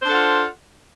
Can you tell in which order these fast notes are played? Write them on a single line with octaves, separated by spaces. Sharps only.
C5 D4 A4 F#5 F4